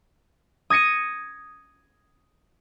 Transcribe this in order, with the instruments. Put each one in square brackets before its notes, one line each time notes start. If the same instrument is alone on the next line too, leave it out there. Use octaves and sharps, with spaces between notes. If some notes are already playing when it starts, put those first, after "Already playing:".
[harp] D#6 G#6 A#6 C#7 D#7